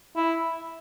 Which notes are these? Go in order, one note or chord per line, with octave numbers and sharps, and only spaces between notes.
E4